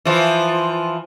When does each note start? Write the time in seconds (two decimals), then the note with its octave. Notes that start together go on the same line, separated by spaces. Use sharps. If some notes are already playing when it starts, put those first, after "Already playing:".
0.05 E3 F3